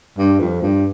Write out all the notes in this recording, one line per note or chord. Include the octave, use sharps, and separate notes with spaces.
G2
F2
G2